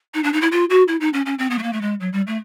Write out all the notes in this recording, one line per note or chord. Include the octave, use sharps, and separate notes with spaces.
D#4
D4
D#4
E4
F4
F#4
E4
D#4
C#4
C#4
C4
B3
A3
A#3
A3
G#3
F#3
G3
A3